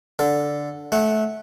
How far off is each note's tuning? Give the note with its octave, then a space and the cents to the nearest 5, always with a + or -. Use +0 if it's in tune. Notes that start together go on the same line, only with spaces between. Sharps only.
D3 -5 A4 +0
A3 -20 F#5 +0